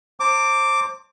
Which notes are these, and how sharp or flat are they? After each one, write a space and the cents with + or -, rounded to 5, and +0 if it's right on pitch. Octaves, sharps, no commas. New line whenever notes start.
C5 +25 A5 +45 D6 +0